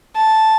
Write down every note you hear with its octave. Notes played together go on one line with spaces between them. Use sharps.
A5